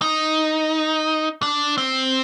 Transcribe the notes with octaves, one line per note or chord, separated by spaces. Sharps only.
D#4
D4
C4